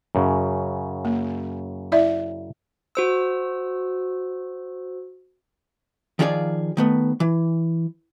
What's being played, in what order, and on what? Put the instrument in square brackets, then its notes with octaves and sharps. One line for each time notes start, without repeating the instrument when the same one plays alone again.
[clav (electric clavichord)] F#2 C#3
[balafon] A#3
E4 D5 E5
[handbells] F#4 C5 E6
[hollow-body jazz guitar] D#3 F3 F4 G#4 C5 D5
D#3 A3 B3
E3